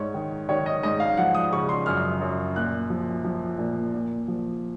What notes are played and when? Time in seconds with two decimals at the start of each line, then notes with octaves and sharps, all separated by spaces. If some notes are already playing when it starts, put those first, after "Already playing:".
Already playing: G#2 C#5
0.14 D#3
0.49 D#3 C#5
0.66 D#5
0.83 G#2 D#5
1.00 F5
1.17 F3 F#5
1.35 D#6
1.52 C#3 C#6
1.69 C6
1.86 F#2 F6
2.21 F#2
2.56 A#2 F#6
2.90 F3
3.24 F3
3.58 A#2
3.94 A#2
4.28 F3